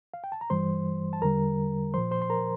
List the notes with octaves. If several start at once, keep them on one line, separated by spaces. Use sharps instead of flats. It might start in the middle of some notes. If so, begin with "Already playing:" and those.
F5
G5
A5
A#5
G2 E3 G3 C5 C6
A5
E2 D3 G3 A#4 A#5
A#2 F3 C5 C6
C5 C6
C6
A#4 A#5